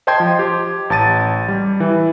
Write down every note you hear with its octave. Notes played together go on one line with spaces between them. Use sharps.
C5 D#5 G5 A5 C6 G#6
F3
G4
A1 A5 A6 D#7
G3
E3